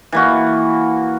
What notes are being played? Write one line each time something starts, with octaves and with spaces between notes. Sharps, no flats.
E3 A#3 F#4